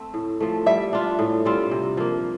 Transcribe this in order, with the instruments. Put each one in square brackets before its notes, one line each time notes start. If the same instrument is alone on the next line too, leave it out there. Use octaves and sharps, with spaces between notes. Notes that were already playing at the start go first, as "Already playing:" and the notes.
Already playing: [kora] A3 C4
A2
F3 A3
[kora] G3 [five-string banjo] E5
[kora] D4 F4
A2
G3 C4 F4
C3
F3 A#3